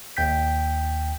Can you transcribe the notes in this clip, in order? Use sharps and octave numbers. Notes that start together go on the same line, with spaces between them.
D#2 G5 G6 B6